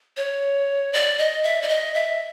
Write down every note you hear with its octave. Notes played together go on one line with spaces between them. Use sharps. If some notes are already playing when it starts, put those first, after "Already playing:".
C#5
D5
D#5
E5
D5
D#5
E5